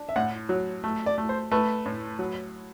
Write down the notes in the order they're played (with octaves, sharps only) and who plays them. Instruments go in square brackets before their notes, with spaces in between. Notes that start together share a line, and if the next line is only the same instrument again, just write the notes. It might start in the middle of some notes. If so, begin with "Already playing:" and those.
Already playing: [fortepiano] D4
[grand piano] E5
[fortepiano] A2 [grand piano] F#5
[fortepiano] F#3
A3
[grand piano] D5
[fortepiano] A3
[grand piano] C5
[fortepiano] A3 [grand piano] B4
[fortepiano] A2
F#3